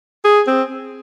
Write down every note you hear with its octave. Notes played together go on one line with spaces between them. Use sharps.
G#4
C4